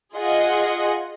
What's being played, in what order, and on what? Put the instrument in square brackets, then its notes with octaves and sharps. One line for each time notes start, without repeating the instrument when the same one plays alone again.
[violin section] F4 G#4 D#5 F#5